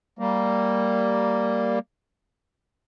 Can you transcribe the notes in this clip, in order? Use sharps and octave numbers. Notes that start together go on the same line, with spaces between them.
G3 A#3